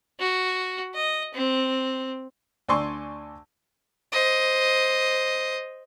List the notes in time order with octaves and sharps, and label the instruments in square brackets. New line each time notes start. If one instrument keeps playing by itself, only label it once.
[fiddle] F#4
D#5
C4
[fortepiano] D2 D5 G#5 C6 C#6 E6
[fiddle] C5 D#5